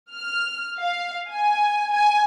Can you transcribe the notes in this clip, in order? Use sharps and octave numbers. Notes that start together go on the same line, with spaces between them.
F6
F5
G#5
G#5